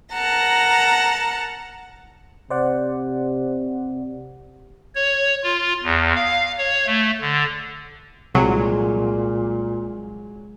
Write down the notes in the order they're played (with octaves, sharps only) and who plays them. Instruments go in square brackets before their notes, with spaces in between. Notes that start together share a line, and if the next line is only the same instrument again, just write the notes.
[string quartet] A#4 F#5 A5 A#5
[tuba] C3 [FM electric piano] C5 D5 F#5
[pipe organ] C#5
F4
E2
F5
C#5
A3
D3
[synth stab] C2 F#3 [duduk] A#2 [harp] G#3